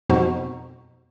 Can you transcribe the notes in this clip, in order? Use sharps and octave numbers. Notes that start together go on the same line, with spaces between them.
F2 B2 F3 B3 D#4 F#4